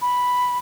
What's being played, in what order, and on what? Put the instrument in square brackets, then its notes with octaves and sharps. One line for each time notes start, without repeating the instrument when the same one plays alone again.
[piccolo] B5